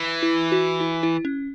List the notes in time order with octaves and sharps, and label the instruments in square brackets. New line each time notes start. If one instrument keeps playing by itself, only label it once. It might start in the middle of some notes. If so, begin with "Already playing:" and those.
Already playing: [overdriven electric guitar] E3
[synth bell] E4
F#4
E4
E4
C#4